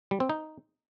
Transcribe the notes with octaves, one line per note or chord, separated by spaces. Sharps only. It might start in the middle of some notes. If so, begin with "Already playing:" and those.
G3
C4
D#4